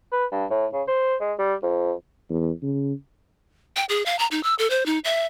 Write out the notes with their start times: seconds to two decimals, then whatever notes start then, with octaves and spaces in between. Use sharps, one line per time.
0.12 B4
0.32 G2
0.50 A2
0.73 C#3
0.88 C5
1.21 G#3
1.39 G3
1.63 F2
2.30 E2
2.63 C#3
3.76 G5
3.89 G#4
4.06 F5
4.19 A#5
4.31 D#4
4.43 E6
4.59 A4
4.70 C5
4.86 D#4
5.04 E5